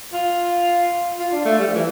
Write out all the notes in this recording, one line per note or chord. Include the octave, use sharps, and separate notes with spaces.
F4
F4
D4
A3
G3
F3
E3